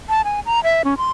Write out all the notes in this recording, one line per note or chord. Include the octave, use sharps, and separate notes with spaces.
A5
G#5
A#5
E5
C#4
C6